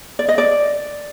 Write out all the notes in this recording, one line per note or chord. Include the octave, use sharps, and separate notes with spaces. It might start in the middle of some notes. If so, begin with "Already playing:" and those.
D5
D#5
D5